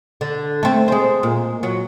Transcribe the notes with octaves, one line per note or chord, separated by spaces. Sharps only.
D3
A3 C4
G#3 C5
A#2
F#3